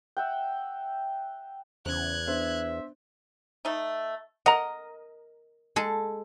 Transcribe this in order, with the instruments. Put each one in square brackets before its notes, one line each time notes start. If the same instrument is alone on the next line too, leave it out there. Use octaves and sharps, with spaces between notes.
[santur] E5 F#5 G5
[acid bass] E2 [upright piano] C#3 C5 [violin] F#6 G#6
[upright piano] B3 D4 C5 [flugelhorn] E5
[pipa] A3 D#4
[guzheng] A#4 [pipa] D#5 [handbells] F#5 A#5
[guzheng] G#3 A4